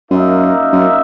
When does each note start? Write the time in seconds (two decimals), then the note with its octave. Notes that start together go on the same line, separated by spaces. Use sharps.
0.11 F#2 A#3 D#4 A#4 E5
0.73 F#2